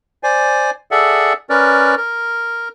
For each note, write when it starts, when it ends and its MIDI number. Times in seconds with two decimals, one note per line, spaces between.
0.23 0.71 72
0.23 0.71 74
0.23 0.71 80
0.91 1.33 68
0.91 1.33 69
0.91 1.33 74
0.91 1.33 76
0.91 1.33 78
1.50 1.95 61
1.50 1.95 70
1.50 1.95 71
1.50 1.95 74
1.97 2.68 70